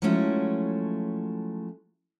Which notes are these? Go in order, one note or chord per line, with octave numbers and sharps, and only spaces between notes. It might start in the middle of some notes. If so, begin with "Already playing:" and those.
F3 F#3 G#3 A3 C#4 E4